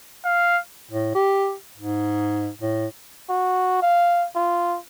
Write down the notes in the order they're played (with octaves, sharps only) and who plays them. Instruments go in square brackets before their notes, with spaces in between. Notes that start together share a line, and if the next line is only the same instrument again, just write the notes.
[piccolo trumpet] F5
[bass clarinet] A2
G4
G#2
A2
[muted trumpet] F#4
F5
F4